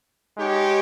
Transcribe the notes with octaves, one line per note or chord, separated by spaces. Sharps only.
G#3 D#4 G4 C#5